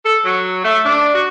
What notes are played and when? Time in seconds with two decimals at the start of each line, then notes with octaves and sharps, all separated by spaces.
0.04 A4
0.24 F#3
0.63 A3
0.85 D4
1.14 F#4